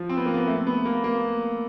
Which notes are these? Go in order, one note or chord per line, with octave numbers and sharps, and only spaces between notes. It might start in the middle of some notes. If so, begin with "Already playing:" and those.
Already playing: F3
C4
B3
A#3
B3
A3
B3
A#3
A#3